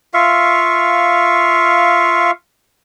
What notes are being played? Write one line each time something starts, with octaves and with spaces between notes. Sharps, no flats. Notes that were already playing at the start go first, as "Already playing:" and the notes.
F4 E5 F5 C#6